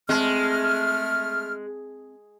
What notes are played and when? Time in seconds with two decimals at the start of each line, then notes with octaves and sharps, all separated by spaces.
0.09 G#3 A3 C4 A5 F6